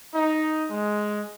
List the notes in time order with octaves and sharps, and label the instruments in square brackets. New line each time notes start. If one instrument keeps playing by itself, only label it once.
[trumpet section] D#4
G#3